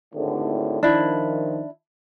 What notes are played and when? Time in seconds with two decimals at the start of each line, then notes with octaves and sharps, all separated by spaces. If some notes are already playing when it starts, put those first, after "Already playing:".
0.15 G#1 A2 D3
0.83 D#3 F3 D4 E4